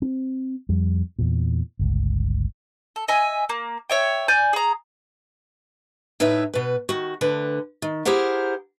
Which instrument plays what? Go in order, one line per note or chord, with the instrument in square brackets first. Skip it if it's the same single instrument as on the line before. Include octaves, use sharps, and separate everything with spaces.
[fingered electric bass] C4
F2 G3
E2 A#2
G1 C#2
[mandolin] A4
D#5 E5 G#5
A#3
C#5 E5 G5
D5 G#5 G6
G#4 A#5
[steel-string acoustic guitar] A2 D#4 B4 C#5 E5
B2 B4
D#3 F#4
D2 D3 B4
D#3
E4 G4 G#4 A#4 C5 F#5